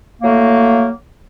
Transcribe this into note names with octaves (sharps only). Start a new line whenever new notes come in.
A2 F#3 A3 A#3